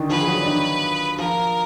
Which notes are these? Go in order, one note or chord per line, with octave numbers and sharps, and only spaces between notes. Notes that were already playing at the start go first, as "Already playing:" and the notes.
Already playing: D3 D#3 D4 D#4
F3 F4 B4
G#4
F#3 F#4
D4
D#3 D#4
F3 F4 A#4